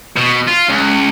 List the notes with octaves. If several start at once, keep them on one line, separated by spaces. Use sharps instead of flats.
B2
F4
C#2